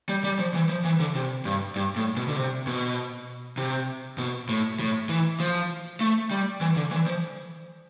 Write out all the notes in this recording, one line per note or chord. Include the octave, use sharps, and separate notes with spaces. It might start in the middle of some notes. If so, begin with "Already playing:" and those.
G3
G3
F3
E3
F3
E3
D3
C3
G2
G2
A2
B2
D3
C3
B2
C3
B2
A2
A2
E3
F3
A3
G3
E3
D3
E3
F3